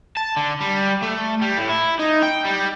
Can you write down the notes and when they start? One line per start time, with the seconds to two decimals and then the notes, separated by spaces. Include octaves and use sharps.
0.17 A5
0.36 D3
0.61 G3
1.02 A3
1.42 G3
1.57 A2
1.69 E4
1.99 D#4
2.22 G5
2.45 G3